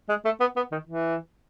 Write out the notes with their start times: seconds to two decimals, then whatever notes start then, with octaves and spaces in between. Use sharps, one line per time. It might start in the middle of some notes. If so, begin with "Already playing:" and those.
0.09 G#3
0.25 A3
0.40 B3
0.56 B3
0.72 D#3
0.87 E3